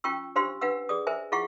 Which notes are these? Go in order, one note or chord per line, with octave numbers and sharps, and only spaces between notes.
C#4 F4 G5 C#6 E6
D4 G4 C5 F5 C6 E6
D4 B4 F5 F#5 E6
G#4 D5 D#6
A#4 C5 E5 G#5
E4 F4 G#4 F5 F#5 C#6